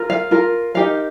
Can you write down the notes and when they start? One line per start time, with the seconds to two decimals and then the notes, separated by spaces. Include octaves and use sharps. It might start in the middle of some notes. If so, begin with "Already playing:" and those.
Already playing: F4 A#4
0.10 F5
0.31 F4 A#4
0.75 D#4 G4 A#4 F5